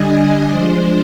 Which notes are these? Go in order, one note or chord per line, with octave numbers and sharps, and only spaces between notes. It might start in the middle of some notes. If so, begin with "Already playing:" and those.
Already playing: D3 G3 D4 D#5 G#5
F3 G#3 D4 C5